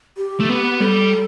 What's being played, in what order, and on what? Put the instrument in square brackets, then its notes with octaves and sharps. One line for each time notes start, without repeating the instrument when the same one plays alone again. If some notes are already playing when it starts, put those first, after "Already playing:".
[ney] G4
[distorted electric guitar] A3
B3
[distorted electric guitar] G3 [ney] A4